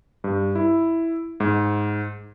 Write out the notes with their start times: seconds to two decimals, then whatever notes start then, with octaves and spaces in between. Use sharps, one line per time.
0.24 G2
0.55 E4
1.40 G#2